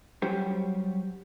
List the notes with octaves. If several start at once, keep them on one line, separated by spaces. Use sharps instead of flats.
F#3 G3 C#4 F#4 G4 C5